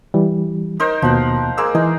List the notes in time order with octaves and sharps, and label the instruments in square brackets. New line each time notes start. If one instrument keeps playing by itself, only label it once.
[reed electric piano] E3 G3
[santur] D#4 A#4 C5
[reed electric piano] D#2 B2 A#3 [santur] F3 F#5
[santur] G#3 A#3 E6
[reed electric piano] E3 D#5 G#5 [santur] D#4